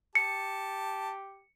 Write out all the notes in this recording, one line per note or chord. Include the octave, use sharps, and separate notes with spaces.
G4 A5 C#7